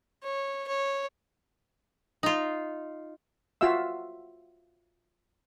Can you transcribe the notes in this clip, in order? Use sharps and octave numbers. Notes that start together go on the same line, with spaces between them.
C#5
C#5
D#4 F4
F4 F#4 E5 F5 E6